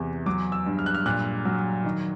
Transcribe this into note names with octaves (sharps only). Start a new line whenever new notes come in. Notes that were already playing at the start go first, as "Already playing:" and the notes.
Already playing: E2 C3 E3
F#3 D6
E6
G2
F6
F#6
F6
A#2 F#6
F#3
D#3